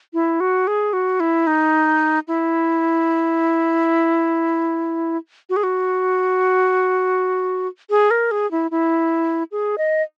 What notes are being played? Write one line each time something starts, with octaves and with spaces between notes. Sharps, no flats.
E4
F#4
G#4
F#4
E4
D#4
E4
F#4
G#4
F#4
G#4
A#4
G#4
E4
E4
G#4
D#5